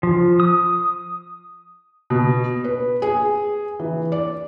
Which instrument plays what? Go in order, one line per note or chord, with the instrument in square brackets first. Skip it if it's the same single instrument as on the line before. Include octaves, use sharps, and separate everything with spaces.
[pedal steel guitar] F3
D#6
[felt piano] B2
B4
G#4
E3
D5